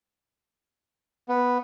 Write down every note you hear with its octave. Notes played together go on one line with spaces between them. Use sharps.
B3